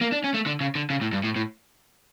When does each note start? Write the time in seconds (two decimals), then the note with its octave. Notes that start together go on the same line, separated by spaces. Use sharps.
0.01 A#3
0.12 D4
0.24 C#4
0.34 A3
0.46 D3
0.61 C#3
0.75 D3
0.90 C#3
1.01 A2
1.13 G2
1.24 A2
1.36 A2